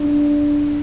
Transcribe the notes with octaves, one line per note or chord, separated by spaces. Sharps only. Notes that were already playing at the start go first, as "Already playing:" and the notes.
Already playing: D4